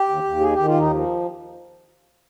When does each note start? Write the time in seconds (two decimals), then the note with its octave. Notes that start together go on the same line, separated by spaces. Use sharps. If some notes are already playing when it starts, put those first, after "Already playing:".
Already playing: G4
0.08 D#2
0.24 D#2
0.41 D#3 G#4
0.53 D#3 G4
0.66 F4
0.74 D#2 D#4
0.90 F3